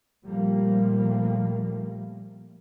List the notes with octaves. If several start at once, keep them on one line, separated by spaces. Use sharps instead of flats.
A#2 F3 G3 A3 A#3